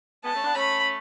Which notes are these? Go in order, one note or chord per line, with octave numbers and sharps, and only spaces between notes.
G#3 B3 A5
A3 C#4
B3 D4
A3 C#4 B5